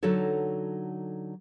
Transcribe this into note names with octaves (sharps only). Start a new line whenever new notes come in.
D3 F#3 D#4 F#4 A4 C#5